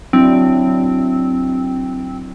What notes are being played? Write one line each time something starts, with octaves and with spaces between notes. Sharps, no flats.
F#3 C4 D4 E4